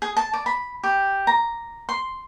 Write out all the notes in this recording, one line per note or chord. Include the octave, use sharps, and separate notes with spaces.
G#4
A5
D5
B5
G4
A#5
C6